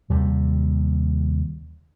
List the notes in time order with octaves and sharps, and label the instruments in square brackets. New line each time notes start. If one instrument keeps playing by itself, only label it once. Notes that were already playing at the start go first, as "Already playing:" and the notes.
[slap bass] D#2 C3 G3